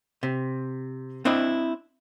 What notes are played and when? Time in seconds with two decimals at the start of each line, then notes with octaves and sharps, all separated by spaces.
0.23 C3
1.25 C4 D4 E4 D#5